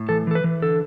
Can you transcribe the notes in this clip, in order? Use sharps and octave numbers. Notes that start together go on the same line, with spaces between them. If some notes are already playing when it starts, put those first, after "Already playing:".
Already playing: A2
E3 A4
E3 A4
B4
E3
D3 A4